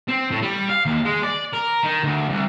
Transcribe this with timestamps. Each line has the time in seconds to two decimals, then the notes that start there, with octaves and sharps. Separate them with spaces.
0.08 C4
0.31 A2
0.43 G3
0.69 F5
0.86 D#2
1.05 G#3
1.23 D5
1.53 A#4
1.83 D#3
2.04 D2
2.30 C2